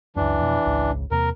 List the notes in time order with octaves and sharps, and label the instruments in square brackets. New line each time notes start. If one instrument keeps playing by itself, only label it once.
[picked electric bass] C#2 F#2 [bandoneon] E3 D4
[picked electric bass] F2 B2
G#1 C#2 C#3
[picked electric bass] E2 C3 A#3 [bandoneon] A#4